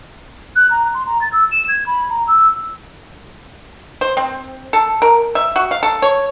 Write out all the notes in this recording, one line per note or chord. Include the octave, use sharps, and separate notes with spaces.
F#6
A#5
C6
A#5
A6
E6
E7
G#6
B5
A#5
E6
C5
C4
A4
A#4
E5
F#4
F5
A4
C#5